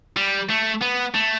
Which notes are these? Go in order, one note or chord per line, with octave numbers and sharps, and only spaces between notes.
G3
A3
B3
A3